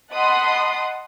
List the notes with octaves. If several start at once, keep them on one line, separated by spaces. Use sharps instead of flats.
D#5 F#5 A5 B5 C6 D#6